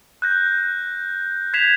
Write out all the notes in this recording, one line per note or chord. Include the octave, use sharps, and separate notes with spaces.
F#6 G6 A#6
G6 G#6 B6 C7 E7 F7